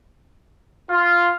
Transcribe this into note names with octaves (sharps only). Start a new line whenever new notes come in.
F4